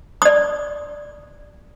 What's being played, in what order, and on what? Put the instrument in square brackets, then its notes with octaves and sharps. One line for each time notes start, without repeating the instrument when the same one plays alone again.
[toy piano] D5 D#6